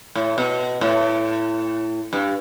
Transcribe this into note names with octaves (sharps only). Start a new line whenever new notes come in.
A2
B2
A2
G2